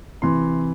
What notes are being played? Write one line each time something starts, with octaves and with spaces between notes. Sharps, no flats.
C3 E3 C6